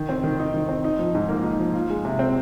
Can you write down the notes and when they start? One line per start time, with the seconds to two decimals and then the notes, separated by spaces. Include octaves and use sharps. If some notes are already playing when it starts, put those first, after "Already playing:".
Already playing: D#3
0.09 C4
0.24 D#3
0.39 D#4
0.54 D#3
0.69 C4
0.84 D#4
0.99 F3
1.15 G#2
1.29 A#3
1.44 D#4
1.59 F3
1.74 F4
1.90 G#3
2.05 C3
2.19 C4